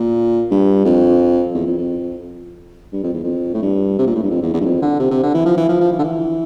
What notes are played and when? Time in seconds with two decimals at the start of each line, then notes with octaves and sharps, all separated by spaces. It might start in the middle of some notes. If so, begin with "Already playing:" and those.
Already playing: A#2
0.51 G2
0.85 F2
1.54 E2
1.67 F2
1.78 F2
2.93 G2
3.03 F2
3.13 E2
3.23 F2
3.54 A2
3.62 G2
3.98 C3
4.07 A#2
4.15 A2
4.23 G2
4.31 F2
4.42 E2
4.53 E2
4.60 G2
4.65 F2
4.82 D3
4.99 C3
5.11 C3
5.23 D3
5.34 E3
5.46 F3
5.57 E3
5.69 F3
5.80 F3
5.92 E3
5.98 D3
6.04 E3